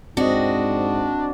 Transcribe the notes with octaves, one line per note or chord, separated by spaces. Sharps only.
G#2 C4 D4 F#4 D#5